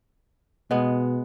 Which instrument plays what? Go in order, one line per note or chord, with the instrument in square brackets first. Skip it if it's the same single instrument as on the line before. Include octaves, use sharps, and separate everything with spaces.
[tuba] B2 [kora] G#3 B3